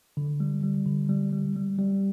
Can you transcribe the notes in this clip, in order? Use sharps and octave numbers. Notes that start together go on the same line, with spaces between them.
D3
G3
G3
D3
G3
G3
G3
G3